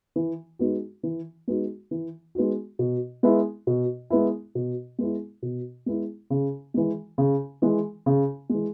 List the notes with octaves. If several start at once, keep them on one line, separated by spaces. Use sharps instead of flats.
E3
G#3 B3 D#4 F#4
E3
G#3 B3 D#4 F#4
E3
G#3 B3 D#4 F#4
B2
G#3 B3 E4
B2
G#3 B3 E4
B2
G#3 B3 E4
B2
G#3 B3 E4
C#3
E3 G#3
C#3
E3 G#3
C#3
E3 G#3